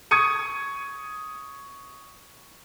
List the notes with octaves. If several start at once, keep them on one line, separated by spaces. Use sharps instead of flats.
C#6 D#6 G#6 C#7 D#7